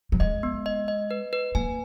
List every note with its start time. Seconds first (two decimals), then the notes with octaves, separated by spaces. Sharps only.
0.12 F#3
0.20 G#3 D#5
0.43 B3
0.66 D#5
0.88 D#5
1.11 B4
1.33 B4
1.55 A#3 G#5